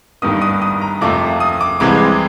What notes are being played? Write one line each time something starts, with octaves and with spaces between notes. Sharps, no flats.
G1 G2 D#3 D#6
D#6
D#6
A#5
F2 C3 F3 A3 D6
D#6
D6
C2 C3 E3 G#3 D6